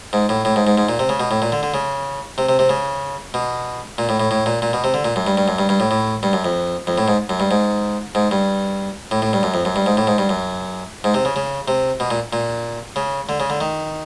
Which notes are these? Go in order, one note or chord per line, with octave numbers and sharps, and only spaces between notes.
G#2
A2
A2
G#2
G#2
G#2
A#2
C3
C#3
B2
A2
A#2
D3
D3
C#3
C3
C3
C3
C#3
B2
A#2
A2
A2
A2
A#2
A#2
B2
C3
D3
A#2
F#2
G2
G2
F#2
G2
G2
A2
A2
G2
F#2
F2
F2
A2
G#2
F#2
G2
G#2
G#2
G2
A2
A2
G2
F#2
F2
F#2
G2
G#2
A2
G#2
G2
F#2
G#2
C3
C#3
C#3
C3
B2
A#2
A#2
C#3
D3
C#3
D3
D#3